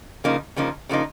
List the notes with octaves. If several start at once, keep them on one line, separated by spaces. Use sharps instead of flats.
C#3 F3 A#3 D#4
C#3 F3 A#3 D#4
C#3 F3 A#3 D#4